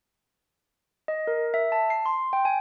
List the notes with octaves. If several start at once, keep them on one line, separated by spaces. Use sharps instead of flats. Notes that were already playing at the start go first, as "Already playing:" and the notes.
D#5
A#4
E5
A5
C7
C6
G5
G#5